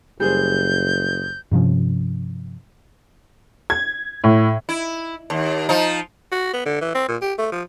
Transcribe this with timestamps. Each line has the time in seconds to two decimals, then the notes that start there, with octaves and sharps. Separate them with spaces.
0.20 F#1 G3 G#4 C5 G6
1.51 G2 C3 F3 C#4
3.70 G#6
4.24 A2
4.69 E4
5.30 D#2
5.69 F3 D#4
6.31 F#4
6.53 B3
6.66 D3
6.81 E3
6.95 C4
7.08 A#2
7.22 G4
7.38 A3
7.52 F3